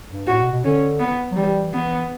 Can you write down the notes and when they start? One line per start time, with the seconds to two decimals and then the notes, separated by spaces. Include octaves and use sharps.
0.10 G2
0.27 A2 F#4
0.40 B2
0.52 B2
0.64 D3 C#4
1.00 B3
1.32 F#3
1.37 E3 G3
1.74 E3 B3